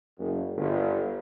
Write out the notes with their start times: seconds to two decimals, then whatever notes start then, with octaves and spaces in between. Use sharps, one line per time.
0.19 F#1
0.57 G1